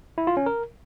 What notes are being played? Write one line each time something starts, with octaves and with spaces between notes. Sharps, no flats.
E4
F4
C#4
A#4